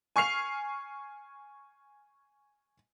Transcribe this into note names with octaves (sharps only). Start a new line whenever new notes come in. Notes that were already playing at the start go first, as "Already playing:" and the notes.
G#5 C#6 F6 C7 F7